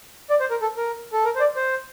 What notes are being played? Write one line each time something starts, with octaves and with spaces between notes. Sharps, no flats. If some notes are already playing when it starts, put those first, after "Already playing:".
D5
C5
A#4
A4
A#4
A4
A#4
C5
D5
C5